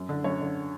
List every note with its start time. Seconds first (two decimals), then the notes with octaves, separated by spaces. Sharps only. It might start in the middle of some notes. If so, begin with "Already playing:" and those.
Already playing: F#2
0.09 D3
0.24 F#2 C#5
0.41 D3